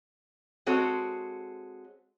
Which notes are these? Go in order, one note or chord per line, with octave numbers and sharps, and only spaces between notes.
G#3 C4 F#4 A4 C#5